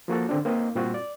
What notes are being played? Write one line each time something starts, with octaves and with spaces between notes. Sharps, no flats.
F3 A#3 F#4 A4
D3 C4 D4
A#3 C4 D#4 D#5
A#2 G3 C4 F4 F#4
D5